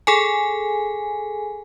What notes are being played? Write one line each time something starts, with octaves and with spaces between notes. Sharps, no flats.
G#4 A4 G#5